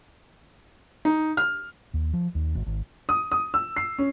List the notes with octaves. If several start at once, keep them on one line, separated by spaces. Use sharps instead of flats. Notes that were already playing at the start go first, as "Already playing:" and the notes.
D#4
F6
D#2
F3
D#2
G#1
G#1
D#6
D#6
E6
C7
C#4